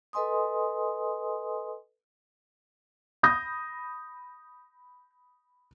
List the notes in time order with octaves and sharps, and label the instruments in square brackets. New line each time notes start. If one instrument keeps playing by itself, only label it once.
[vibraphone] A4 B4 D#5 G#5 C6 D#6
[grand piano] B5 D#6 G6 A#6